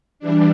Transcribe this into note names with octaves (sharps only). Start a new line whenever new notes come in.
E3 G3 D4